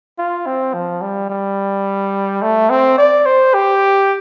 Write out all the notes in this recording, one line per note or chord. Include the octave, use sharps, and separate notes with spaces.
F4
C4
F3
G3
G3
A3
C4
D5
C5
G4